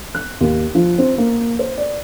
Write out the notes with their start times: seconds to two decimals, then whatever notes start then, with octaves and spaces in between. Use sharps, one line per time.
0.15 F#6
0.41 D#2
0.75 F3
0.98 C4
1.18 A#3
1.59 C5
1.77 D5